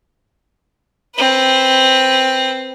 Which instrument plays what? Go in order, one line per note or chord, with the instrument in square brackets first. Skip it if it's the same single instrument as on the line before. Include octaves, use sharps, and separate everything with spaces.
[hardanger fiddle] C4 B4